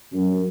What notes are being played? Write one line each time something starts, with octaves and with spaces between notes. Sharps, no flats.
F#2